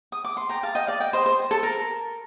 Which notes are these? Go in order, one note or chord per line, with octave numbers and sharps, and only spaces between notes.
D#6
D6
C6
G5 A#5
F5 A5
D#5 G5
D5 F5
D#5 G5
C5 D#5
C5
A4
A#4